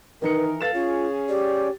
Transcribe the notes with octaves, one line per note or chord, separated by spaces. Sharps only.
D#3 E3 D#4 A#4 B4 C#7
A4 B4 F5 A6 E7
C#4 F4 G#4 C#5
G4 D5